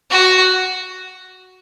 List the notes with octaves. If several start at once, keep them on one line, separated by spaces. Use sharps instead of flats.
F#4